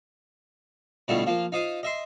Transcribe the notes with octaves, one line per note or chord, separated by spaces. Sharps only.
B2 D3 G3 A3 E4 F4
F3 A#3 F4
D#4 F4 C5 D#6
D#5 E5 C6